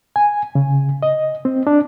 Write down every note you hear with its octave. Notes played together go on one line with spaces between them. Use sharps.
G#5
C#3
D#5
C4
D4